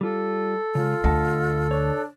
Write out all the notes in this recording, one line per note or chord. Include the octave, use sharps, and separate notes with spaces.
G3 F4 A4
C#3 G#3 F4
D2 D#5 F#5 A5
D4 C#5